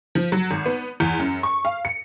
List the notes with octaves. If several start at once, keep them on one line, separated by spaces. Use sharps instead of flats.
F3
F#3
G#1
B3
E2
F#2
C#6
F5
C#7